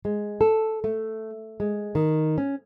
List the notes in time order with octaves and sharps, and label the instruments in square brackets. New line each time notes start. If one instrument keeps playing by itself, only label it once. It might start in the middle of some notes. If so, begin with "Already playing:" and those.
[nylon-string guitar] G#3
A4
A3
G#3
D#3
C#4